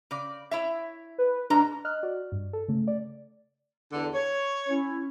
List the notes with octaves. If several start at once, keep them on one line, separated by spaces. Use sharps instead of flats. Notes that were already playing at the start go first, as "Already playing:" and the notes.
C#3 D5
E4 C#5 E5
B4
G#2 G#3 D4 A#5
D#5 F6 F#6
F#4 D5
G2
A4
C#3 A3
D5
E2 D3
C#5
C#4 E4